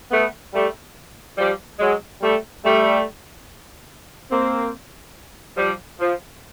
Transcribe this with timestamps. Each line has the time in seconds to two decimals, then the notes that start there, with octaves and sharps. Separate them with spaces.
0.12 A3 B3
0.53 G3 A3
1.38 F3 G3
1.79 F#3 G#3
2.22 G3 A3
2.63 G3 A3
4.31 A#3 C4
5.57 F3 G3
6.00 F3